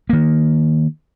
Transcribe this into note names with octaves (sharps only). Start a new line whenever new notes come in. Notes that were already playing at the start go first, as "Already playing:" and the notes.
D#3 A#3